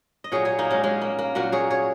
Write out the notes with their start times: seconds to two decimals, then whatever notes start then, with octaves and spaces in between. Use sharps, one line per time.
0.24 D#5
0.32 A#2 F#3 G#4 C#5
0.45 G#4 C#5
0.59 A#3 D#4
0.71 G#3 C#4
0.84 G#3 C#4
1.02 A#3
1.19 A#3
1.35 A#2 F#3 F#4 A#4
1.52 G#4 C#5
1.70 G#4 C#5